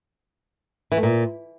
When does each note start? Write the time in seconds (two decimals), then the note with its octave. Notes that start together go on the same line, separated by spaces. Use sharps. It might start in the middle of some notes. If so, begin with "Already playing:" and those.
0.92 E3
0.97 A3
1.03 A#2